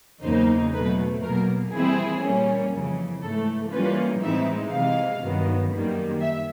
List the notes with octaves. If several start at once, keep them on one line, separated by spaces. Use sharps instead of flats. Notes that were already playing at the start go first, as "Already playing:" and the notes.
E2 C#3 F#3 A#3 D#4 C5
B2 F#3 A3 B4
B2 F#3 A#3 A#4
E3 G3 C4 E4 G#4
A#2 G3 A#3 C#4
F2 C#3 E3
G#2 E3 A3 A4
E3 G3 A#3 C#4 F4 B4
A2 E3 G#3 C4 D#4 E5
C3 E3 G#3 F5
G2 D#3 F#3 B3
F#2 D#3 G3 A#3
E5